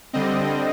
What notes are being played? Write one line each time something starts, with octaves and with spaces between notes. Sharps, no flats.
D3 G3 C4 D#5